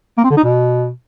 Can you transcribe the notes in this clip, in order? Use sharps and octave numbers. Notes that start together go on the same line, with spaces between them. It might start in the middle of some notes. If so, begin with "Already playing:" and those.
A#3
C4
D3
D#4
B2